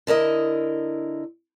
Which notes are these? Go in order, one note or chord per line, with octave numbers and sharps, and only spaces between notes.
D3 E4 A#4 D#5